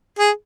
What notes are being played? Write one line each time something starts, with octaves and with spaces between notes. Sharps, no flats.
G#4